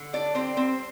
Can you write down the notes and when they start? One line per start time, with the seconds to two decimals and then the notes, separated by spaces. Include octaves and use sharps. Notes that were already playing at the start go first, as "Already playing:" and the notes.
Already playing: D3
0.13 D4 D5
0.35 G3 C4 C5
0.57 C4 C5